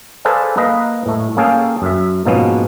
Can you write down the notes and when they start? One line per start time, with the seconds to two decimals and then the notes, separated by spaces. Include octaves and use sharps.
0.25 G#4 A4 B4 C5 D5 F5
0.57 A#3 B4 D#5 F5
1.06 A2 A3
1.37 A#3 C#4 G#4 A4 F5 G5
1.82 F#2 E5
2.26 G#2 B2 F3 A#3 B3 C#4